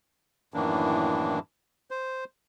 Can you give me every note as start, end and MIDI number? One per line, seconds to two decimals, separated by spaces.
0.54 1.39 42
0.54 1.39 45
0.54 1.39 51
0.54 1.39 52
0.54 1.39 58
0.54 1.39 62
1.91 2.24 72